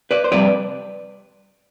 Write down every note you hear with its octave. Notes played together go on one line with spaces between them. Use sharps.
B4 D5
C5
F2 C3 G3 B4 D5